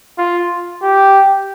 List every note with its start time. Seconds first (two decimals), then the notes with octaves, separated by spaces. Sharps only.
0.18 F4
0.83 G4